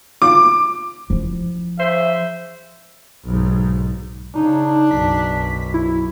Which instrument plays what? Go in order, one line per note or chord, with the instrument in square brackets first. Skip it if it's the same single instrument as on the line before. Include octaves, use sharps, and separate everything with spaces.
[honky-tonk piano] D6
[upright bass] F3 E4
[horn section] C#3 C5 E5
[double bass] B1 G#2
[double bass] C#3 [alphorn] D4 [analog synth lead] D#4
[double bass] B1 F#2 [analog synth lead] B6
[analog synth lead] E4